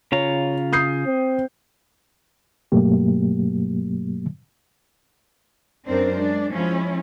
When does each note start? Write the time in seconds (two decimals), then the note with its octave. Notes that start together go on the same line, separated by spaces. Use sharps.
0.12 C#3 F4 C#5 A#5
0.73 D#6 G6 C7
1.06 C4
2.72 G2 B2 F#3 A3 A#3 G4
5.86 F#2 C4 D4 A#4 C5
6.15 G#3 D4
6.52 F3 G#3 C#4 E4